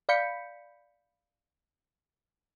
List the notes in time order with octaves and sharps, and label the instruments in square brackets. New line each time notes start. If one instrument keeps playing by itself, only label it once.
[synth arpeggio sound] D5 F5 B5 G6 B6 C#7